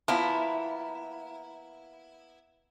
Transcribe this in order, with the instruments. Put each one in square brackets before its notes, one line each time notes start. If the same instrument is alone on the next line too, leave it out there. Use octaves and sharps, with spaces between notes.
[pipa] F3 A#3 [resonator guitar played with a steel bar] B3 E4